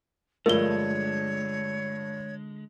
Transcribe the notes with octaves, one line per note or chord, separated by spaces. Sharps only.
G2 D3 F3 G#3 A3 A#4 C#5 G7